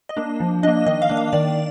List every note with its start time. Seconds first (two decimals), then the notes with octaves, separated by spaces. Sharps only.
0.09 D#5
0.17 A#3 D4
0.40 F3
0.63 A#3 D4 D#5
0.86 D#3 D#5
1.02 F5
1.10 A#3 D4
1.17 F5
1.33 D#3 D5